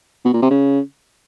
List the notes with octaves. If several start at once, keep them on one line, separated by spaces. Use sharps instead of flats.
B2
A#2
C3
C#3